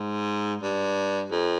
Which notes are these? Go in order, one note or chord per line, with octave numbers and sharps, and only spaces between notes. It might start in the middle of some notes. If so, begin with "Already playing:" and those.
Already playing: G#2
G2
F2